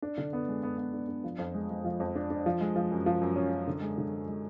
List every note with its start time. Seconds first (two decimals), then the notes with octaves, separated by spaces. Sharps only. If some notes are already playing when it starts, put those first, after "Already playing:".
0.02 D4
0.18 D3
0.33 B3
0.48 G#3
0.63 B3
0.78 B3
0.93 D4
1.09 D4
1.24 F3
1.38 F2
1.54 G#3
1.70 G#3
1.85 F3
2.00 F2
2.15 D4
2.30 D4
2.46 F3
2.61 G#3
2.76 F3
2.91 F#2
3.06 F3
3.21 F#2
3.36 C#4
3.52 F#2
3.67 D3
3.82 G#3
3.98 D3
4.13 G#3
4.28 G#3